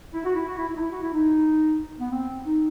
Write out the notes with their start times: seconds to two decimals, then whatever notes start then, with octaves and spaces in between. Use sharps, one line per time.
0.13 E4
0.24 F#4
0.35 E4
0.46 F#4
0.57 E4
0.68 E4
0.74 D#4
0.79 E4
0.91 F#4
1.02 E4
1.13 D#4
1.99 B3
2.11 C4
2.45 D#4